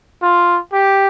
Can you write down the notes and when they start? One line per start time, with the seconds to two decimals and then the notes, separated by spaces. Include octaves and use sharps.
0.22 F4
0.73 G4